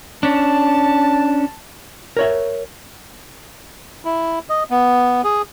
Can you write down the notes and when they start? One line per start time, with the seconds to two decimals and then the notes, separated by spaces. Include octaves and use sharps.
0.23 C#4 D4 A5
2.17 A#4 C#5 E5
4.05 E4
4.49 D#5
4.70 B3
5.24 G#4